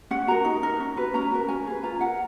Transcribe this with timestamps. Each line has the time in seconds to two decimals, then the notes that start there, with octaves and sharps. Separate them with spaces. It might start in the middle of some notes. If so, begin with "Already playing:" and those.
0.11 C#4 F#5
0.27 F#4 A#4 A#5
0.45 D#4
0.63 A#4
0.80 C#4
0.97 F#4 B4
1.14 C#4 A#5
1.31 F#4 A#4
1.49 C#4 G#5
1.67 G#4 B4
1.83 F4 A#5
2.01 A#4 F#5